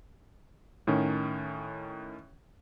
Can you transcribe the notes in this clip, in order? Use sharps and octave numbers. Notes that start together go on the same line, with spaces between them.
A2 D#3 C#4